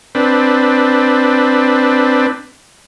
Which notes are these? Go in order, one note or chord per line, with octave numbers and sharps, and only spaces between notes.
C4 D4 B4